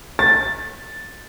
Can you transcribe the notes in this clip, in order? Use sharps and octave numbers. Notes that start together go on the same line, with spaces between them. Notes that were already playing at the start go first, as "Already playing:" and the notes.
A6